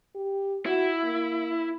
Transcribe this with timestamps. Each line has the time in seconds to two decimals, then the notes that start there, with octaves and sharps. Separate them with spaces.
0.15 G4
0.66 E4 F#4
1.03 A#3